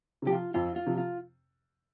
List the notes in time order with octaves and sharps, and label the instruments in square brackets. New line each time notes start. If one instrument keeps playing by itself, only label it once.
[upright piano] C3 F3 [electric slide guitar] G4
[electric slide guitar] F4
[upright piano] F2 [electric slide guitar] F4
[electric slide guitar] F4
[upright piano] C3 F3
[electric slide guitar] F4